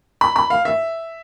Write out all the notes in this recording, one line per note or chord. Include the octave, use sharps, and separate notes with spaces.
B5
B5
F5
E5